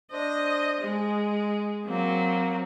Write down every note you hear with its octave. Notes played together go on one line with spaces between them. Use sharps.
D4 C5 D#5
G#3 D#5
F#3 A#3 C4